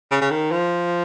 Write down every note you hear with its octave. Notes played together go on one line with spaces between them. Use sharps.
C#3
C#3
D#3
F3